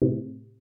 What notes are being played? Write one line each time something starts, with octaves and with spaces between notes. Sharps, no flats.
A2 C3